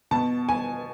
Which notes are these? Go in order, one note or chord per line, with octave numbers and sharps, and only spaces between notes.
B2 A5
G#5